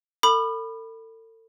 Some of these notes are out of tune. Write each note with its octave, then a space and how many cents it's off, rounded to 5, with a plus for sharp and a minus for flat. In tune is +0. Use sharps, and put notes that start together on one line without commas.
A4 +40 B5 +0 D6 +45